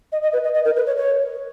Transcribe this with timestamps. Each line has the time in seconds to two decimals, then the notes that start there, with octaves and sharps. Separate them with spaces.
0.12 D#5
0.22 D#5
0.33 B4
0.44 D#5
0.54 D#5
0.65 A#4
0.76 B4
0.86 C#5
0.97 C#5